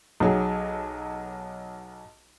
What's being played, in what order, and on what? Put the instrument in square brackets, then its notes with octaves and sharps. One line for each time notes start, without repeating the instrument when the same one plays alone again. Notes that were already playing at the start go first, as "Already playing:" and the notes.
[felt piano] B1 F#3 G#4